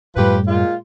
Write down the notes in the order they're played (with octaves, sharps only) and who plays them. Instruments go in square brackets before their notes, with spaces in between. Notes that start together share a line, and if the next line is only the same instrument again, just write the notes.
[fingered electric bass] F#2 A2 G3 [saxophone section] F3 G4 B4
[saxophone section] A#2 G#3 F4